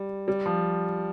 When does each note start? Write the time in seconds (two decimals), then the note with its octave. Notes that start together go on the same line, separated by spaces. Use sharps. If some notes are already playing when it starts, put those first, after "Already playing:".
Already playing: G3
0.28 G3
0.46 F3